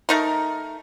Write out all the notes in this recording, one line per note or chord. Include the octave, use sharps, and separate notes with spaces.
A3 D#4 A#4